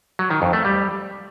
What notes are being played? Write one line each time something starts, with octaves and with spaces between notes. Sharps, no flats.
F#3
D#3
F2
A3
G3